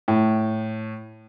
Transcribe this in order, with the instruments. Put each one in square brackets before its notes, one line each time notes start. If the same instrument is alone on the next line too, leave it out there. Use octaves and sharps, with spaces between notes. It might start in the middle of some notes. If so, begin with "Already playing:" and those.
[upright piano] A2